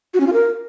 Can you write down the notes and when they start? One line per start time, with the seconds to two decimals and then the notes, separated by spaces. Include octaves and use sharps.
0.14 F#4
0.20 C#4
0.27 F4
0.33 A#4